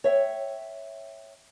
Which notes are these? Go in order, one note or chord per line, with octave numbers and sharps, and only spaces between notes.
C#5 E5 F5 G5